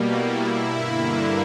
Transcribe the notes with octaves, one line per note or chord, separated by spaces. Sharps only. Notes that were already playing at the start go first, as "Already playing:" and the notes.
Already playing: B2 G3 A#3
E4
G2 D3 A#3